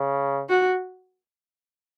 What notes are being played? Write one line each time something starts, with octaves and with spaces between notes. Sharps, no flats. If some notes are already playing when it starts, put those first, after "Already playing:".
Already playing: C#3
F#4